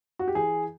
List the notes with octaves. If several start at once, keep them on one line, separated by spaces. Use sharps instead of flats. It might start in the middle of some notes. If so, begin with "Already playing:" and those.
F#4
G4
E3 G#4